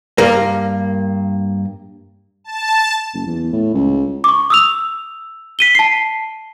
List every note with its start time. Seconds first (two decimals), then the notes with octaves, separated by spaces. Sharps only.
0.18 G2 A#3
2.44 A5
3.13 F#1
3.26 E2
3.53 A2
3.74 C#2
4.24 C#6 D6
4.50 D#6 E6 F7
5.59 B6 D#7 G7
5.75 A5 C7